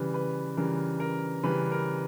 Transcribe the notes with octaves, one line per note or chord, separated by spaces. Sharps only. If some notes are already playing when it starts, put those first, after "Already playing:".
Already playing: C#3 E3 G3 B4
B4
C#3 E3 G3 A#4
A#4
C#3 E3 G3 B4
A#4